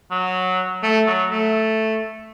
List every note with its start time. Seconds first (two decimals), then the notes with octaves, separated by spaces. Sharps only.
0.11 F#3
0.83 A3
1.07 F#3
1.31 A3